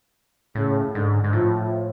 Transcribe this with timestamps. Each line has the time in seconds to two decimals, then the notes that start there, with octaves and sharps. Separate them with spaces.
0.55 A2 C#3
0.94 G#2 D3
1.24 G#2
1.33 A2 F3